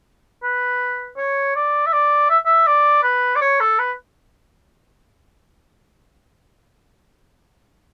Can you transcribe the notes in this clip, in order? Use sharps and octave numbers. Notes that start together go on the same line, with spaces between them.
B4
C#5
D5
E5
D5
E5
E5
D5
B4
D5
C#5
A4
B4